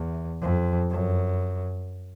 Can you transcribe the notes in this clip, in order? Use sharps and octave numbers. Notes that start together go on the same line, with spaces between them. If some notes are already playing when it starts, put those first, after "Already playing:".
Already playing: E2
F2
F#2